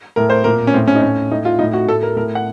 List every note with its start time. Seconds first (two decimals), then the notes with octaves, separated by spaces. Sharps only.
0.16 A2 A#4
0.30 C5
0.44 A#2 A#4
0.67 C#4
0.74 A2 C4
0.88 C#4
0.95 D#4
1.02 A2 C#4
1.31 A2 D#4
1.45 F4
1.59 A2 D#4
1.73 F#4
1.87 A2 A4
2.03 A#4
2.16 A2 A#4
2.35 F#5